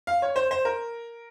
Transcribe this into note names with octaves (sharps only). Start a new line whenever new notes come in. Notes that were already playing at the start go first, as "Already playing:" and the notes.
F5
C#5
C5
C5
A#4